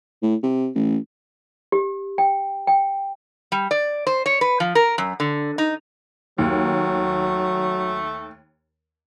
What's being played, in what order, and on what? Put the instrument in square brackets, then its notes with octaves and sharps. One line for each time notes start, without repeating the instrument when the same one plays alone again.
[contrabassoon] A2
C3
A1
[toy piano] G4
G5
G5
[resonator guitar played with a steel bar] G3
D5
C5
C#5
B4
F3
A#4
F#2
D3
D#4
[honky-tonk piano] D#2 [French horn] F#3 [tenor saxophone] A3